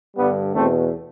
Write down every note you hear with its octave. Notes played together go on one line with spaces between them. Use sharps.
G2 D3 G3 B3
E2 B2 A3 C4